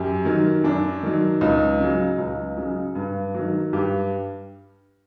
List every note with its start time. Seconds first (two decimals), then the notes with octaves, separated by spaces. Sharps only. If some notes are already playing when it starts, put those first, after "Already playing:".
Already playing: F#2 G4
0.25 D#3 F#3
0.64 F#2 D4
1.03 D#3 F#3
1.41 C#2 D#4
1.79 C#3 F#3
2.18 C#2
2.57 C#3 F#3
2.95 G2
3.34 D#3 F#3
3.73 G2 G4